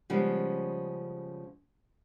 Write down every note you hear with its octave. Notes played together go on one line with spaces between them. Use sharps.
C#3 F3 G3 G#3 B3 C#4